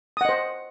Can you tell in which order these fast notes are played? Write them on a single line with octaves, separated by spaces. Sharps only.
D#6 F#5 D#5 C5